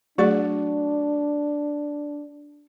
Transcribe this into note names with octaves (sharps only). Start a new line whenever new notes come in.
F#3 A3 D4 F#4 G#4 D5